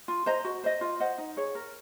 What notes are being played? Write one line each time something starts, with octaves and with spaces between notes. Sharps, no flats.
F4
C5 D#5 A#5
F#4
C5 D#5
F4
C5 D#5 F#5
D#4
G#4 C#5
A#4